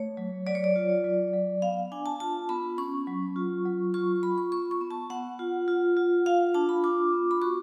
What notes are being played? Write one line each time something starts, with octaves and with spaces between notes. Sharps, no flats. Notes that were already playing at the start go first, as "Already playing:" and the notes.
Already playing: A3 C#5
F#3
F#3 D5
C#5
D5
F4
F#3
F#3
B3 F5
D4 G#5
A5
F4 A5
B3 B5
C#4 C#6
F#3
F4
F#3
F4 C#6
F4 B5
C#6
B3 C#6
C#6
B3
A5
B3 F#5
F4
F4
F4
F4 F5
D4 A5
B5
F4 D6
B3
B5
F#4 C#6